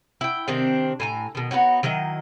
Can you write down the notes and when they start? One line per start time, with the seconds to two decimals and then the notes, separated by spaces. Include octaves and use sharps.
0.21 E4 G5
0.48 C3 D#3 C4 D4
1.00 A2 G#5 A#5
1.35 B2 D#3
1.51 B3 D#4 F#4 C#5
1.83 D#3 F#3 E4 D#5